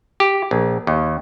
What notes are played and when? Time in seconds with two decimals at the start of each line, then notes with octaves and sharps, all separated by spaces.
0.20 G4
0.51 A#1
0.87 D#2